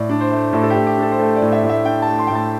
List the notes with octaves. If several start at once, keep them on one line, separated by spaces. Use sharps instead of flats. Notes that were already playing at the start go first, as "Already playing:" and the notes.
Already playing: A2 D5
D4
C5
A3
A2 A4
A4
G4
A2
G4
D4 A4
C5
A3 A4
D5
A2
E5
A2
E5
D4 G5
A5
A3
C6
A2 G5
A5